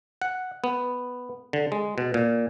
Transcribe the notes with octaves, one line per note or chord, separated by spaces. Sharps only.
F#5
B3
D3
G#3
B2
A#2